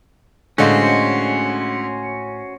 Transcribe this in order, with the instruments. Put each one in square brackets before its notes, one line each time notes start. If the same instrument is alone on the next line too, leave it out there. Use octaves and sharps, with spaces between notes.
[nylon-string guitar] A2 D#5 F5 [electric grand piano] D3 G#3 [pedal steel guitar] C#4 F#4 C5